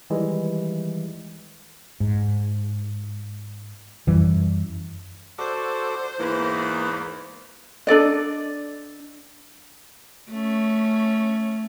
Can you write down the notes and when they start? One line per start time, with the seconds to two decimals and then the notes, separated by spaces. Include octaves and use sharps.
0.10 D#3 E3 G3 G#3
2.00 G#2
4.07 F#2 E3 G3
5.38 F#4 A4 C5 D5
6.19 E2 G#2 E3 A#3
7.87 D4 A4 D5 D#5
10.31 A3 C#4